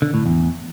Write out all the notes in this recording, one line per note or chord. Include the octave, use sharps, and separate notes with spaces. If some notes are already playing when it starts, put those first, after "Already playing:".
D3
A2
E2